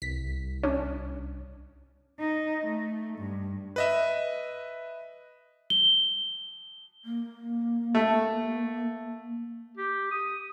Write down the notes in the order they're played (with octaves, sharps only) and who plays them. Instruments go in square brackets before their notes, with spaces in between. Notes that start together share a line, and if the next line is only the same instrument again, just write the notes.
[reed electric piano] C2 [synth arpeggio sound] B6
[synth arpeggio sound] C#4 D4
[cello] D#4
A3
G2
[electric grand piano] B4 D#5 E5
[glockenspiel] G7
[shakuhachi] A#3
[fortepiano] A3
[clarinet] G4
D#6